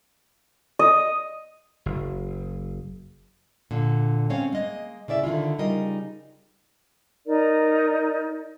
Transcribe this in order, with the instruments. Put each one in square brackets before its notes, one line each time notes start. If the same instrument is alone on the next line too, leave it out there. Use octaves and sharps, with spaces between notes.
[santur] D#5
[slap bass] F#1
[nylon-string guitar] A#2 D3
G#3 C4 C#4 C#5 F5
G#3 A#3 D#5
C#3 E4 D5 E5
D3 D#3 E4 F4
C#3 G3 D#4 F4 A#4 D#5
[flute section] D#4 A#4 D5